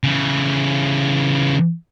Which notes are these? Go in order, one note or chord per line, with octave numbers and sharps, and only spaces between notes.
C#3 E3